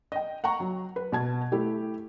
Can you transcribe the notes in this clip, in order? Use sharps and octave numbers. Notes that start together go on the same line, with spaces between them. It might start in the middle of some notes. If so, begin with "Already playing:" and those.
D#5 G5
F#5 G5 A#5 C#6
F#3
B4
B2 A5 G#6
A3 E4 G4